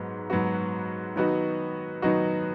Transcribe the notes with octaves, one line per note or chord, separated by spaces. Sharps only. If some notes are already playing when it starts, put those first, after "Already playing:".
Already playing: G#2 F#3 B3
G#2 F#3 B3 F#4
D#3 F#3 B3 D#4 F#4
D#3 F#3 B3 D#4 F#4